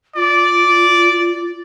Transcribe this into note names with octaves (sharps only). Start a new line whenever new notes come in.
F4 D5